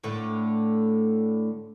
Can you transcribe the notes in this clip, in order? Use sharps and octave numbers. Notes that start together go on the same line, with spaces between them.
A2 D3 A3